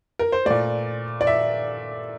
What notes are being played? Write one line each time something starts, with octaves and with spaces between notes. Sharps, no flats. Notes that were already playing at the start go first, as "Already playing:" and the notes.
A#4
C5
A#2 A3 D5
D5
E5